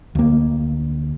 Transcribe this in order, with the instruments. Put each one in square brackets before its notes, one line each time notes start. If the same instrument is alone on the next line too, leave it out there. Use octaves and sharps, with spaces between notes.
[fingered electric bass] D2 A#3